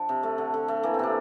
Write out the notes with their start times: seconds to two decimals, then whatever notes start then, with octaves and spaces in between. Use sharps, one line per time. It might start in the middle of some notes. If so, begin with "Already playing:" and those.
Already playing: F3 D4
0.09 C3
0.23 A3
0.38 D3
0.54 D3
0.68 A3
0.83 E3 A#3
0.94 C4
0.99 C3 D4